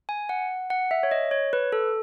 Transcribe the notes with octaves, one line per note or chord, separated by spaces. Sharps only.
G#5
F#5
F#5
E5
C#5
D#5
C#5
B4
A4